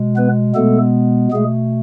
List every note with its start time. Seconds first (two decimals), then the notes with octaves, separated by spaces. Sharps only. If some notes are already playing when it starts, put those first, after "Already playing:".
Already playing: B2 G#3
0.16 B3 B4
0.55 B2 G#3 A3 B3 A4
1.32 B2 G#3 A3 G#4